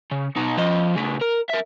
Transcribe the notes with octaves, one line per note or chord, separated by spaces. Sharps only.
C#3
B2 D#4
F3 D#5
C#3 A3
A#4
A#4 E5